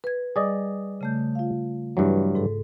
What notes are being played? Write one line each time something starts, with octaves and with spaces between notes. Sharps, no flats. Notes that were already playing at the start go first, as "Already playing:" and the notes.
B4 G#6
G3 G#4 D5 D#5
C#3 A3 G6
F4 F5
G2 E3 F#3
G#2 A4